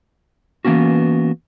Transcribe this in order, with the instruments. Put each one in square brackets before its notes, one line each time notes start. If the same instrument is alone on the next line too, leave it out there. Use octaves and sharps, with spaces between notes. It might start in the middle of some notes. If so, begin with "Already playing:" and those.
[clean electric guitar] E3 A#3 B3 C#4 F#4